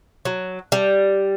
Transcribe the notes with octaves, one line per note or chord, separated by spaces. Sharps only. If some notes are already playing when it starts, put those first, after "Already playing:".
F#3
G3